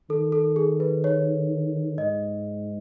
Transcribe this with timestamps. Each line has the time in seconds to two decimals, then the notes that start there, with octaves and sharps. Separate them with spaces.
0.10 D#3 A4
0.32 A4
0.56 G#4
0.80 B4
1.04 C#5
1.97 G#2 D#5